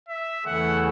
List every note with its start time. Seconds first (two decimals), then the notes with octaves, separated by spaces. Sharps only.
0.09 E5
0.46 E2 C#3 E3 A3 F#5